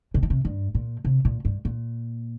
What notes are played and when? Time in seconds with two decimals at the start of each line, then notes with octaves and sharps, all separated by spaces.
0.14 C3
0.23 D#3
0.30 C3
0.45 G2
0.75 A#2
1.05 C3
1.25 A#2
1.45 G2
1.65 A#2